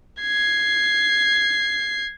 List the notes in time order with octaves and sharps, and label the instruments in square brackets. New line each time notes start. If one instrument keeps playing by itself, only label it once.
[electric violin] G#6 C7